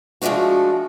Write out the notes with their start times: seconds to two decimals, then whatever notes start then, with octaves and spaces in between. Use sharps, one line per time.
0.22 F3 G#3 A3 D4 F#4